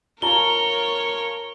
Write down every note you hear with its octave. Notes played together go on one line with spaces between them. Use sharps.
F4 A#4 C#5 A5 A#5 G7